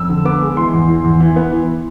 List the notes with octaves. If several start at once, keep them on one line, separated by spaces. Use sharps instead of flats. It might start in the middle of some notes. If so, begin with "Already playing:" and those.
Already playing: F2 E6
D3
B3 D6
G#3
E3 C6
E2
E3
E2
E3
B3
E3